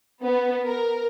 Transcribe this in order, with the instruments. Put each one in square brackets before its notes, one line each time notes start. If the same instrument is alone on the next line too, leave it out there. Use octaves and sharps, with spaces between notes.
[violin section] B3
A#4